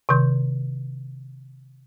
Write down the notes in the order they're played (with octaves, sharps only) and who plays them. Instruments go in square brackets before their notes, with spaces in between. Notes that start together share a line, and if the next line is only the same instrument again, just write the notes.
[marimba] C3 D#3 C6 G6